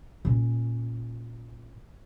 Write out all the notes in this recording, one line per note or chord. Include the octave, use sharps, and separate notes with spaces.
A#2 C#4